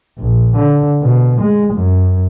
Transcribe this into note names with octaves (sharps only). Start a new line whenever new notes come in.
A#1
D3
B2
G#3
F#2